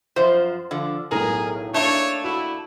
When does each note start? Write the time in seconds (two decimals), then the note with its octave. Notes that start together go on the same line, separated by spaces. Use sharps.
0.16 F#2 F3 C5
0.71 D3 F3
1.11 B1 A2 G#4 A#4
1.74 A3 A#3 D4 C#5
2.24 E4 F#4